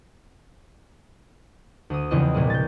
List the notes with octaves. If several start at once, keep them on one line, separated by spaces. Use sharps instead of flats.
D2 D#6
E2 C#3 E3 F3 C4 D#5
C2 A#2 G#3
G6 A6